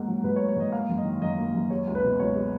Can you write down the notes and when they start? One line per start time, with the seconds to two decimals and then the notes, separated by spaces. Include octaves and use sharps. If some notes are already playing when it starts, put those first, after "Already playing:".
Already playing: G#2 A#3 F#5
0.08 F#3
0.24 G#2 B4
0.36 C#5
0.40 A#3
0.48 C#5
0.56 G#2 D#5
0.72 A#3 F5
0.89 F#2
0.98 D#5
1.05 D#3
1.22 F#2 D#5
1.38 A#3
1.54 F#2
1.70 G#3 C#5
1.87 C#2
1.95 B4
2.04 B2
2.19 C#2 C#5
2.36 G#3